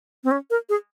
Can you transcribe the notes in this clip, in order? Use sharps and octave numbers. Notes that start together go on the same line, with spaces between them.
C4
C#4
A#4
G#4